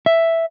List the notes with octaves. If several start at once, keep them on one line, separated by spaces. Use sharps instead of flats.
E5